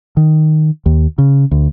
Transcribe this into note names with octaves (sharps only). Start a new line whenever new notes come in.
D#3
D#2
C#3
D2